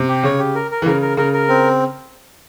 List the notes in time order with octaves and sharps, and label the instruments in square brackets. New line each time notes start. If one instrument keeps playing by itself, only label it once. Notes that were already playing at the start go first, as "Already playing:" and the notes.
Already playing: [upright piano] C3
[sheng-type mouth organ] G4
[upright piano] C#3 [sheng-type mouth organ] C#5
[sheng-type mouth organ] G4
A#4
A#4
[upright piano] E3
[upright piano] C#3 [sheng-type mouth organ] A#4
[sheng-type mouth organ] A#4
[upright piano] C#3 [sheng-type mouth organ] A#4
[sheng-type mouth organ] A#4
C4